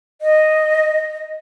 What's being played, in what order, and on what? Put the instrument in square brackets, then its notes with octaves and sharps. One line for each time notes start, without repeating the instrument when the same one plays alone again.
[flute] D#5